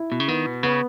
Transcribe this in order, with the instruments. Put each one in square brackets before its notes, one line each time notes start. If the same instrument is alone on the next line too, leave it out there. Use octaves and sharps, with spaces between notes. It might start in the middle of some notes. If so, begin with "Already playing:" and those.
Already playing: [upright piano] E4
[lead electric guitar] B2
C#3
[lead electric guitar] D#3 [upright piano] B3
[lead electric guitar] B2
[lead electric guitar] C#3 [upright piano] B3